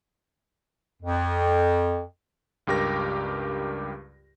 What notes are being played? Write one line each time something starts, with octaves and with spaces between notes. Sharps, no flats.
F2
C#2 G2 G4 A#4 A#6